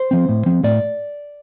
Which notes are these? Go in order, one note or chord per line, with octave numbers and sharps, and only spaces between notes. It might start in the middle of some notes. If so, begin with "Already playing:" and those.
Already playing: C5
F3 C4
A2
F3 C4
A2 D5